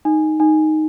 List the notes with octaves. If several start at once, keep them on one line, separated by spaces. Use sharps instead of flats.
D#4
D#4